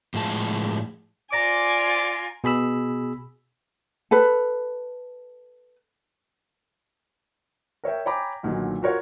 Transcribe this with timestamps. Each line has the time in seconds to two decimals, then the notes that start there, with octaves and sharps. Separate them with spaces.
0.14 A2 F3 G#3 A5
1.33 F4 D5 G#5 A#5 D6 A#6 D7
2.44 B2 G#4 B5 E6
4.11 A4 B4
7.84 A#4 C#5 E5 G5
8.06 C#5 G5 G#5 A#5 B5 D6
8.43 B1 A#2 D3 D#3 F#3
8.82 F4 F#4 A#4 C#5 F#5